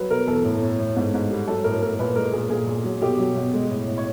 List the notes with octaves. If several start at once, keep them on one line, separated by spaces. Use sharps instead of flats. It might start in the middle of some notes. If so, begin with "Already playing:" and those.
Already playing: F#3 B4
B2 A#4
E2 A4
A2
A2
A2
G#2
G#2
G3
F#3 A4
A2 A#4
A2 A#4
A#2 B4
G#3 A#4
A#2 G#4
A#2 G#4
A#2
F#3
B2 G4
F#3
B2
G#3
A2
A2
C#5